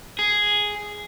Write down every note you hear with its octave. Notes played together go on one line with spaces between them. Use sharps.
G#4